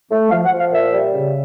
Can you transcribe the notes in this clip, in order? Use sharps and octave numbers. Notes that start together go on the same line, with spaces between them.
A3
F3 F5
F#5
F3
F5
A#2 E5
G3
C#3